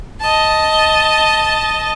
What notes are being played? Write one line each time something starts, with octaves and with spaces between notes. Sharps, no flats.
D#5 A5